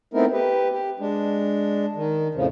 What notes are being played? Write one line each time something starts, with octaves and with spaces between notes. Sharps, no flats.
A3 B3 C4 D#4 E4 A#4
G4 B4
G4
G#3 D4
D#3
F2 A2 C#3 F3